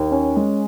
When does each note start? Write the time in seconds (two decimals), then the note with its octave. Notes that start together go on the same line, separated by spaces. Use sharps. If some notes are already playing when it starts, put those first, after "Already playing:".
Already playing: D#2
0.11 C#4
0.36 G#3